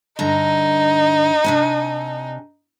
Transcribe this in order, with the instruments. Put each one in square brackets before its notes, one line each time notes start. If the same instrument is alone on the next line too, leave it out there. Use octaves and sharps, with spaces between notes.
[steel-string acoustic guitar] G2 D3 A#5 [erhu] D#4
[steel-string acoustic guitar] C3 D4 G#5